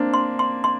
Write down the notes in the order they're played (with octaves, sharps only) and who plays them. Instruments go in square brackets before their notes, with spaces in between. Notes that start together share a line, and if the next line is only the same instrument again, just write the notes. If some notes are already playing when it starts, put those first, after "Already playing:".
Already playing: [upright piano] A#3 C4 D4
[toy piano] C6
C6
C6